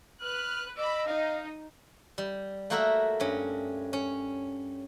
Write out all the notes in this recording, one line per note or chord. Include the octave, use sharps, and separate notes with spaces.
B4 F6 F#6
D#5 B5 D6 E6
D#4 F5
G3
A3 A#3 F#4 A#4 E5 B5
G2 C#4
C#4